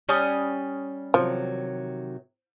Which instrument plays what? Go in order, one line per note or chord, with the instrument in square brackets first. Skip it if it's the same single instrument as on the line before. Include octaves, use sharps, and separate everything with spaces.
[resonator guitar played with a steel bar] G3 G#5 [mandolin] C#4 D#6
[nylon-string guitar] C3 D#3 F#3 [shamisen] F3